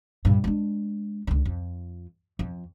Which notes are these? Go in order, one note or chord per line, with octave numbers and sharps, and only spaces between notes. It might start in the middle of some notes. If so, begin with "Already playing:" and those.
G2 A#2
G#3 D4
C#2 D3
F2
F2